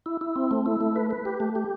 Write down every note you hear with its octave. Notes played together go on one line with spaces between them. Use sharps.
E4
E4
C4
A3
E4
A3
B4
B4
G4
A3
G4